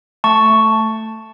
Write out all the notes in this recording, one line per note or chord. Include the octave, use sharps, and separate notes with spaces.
A3 A5 C#6
A3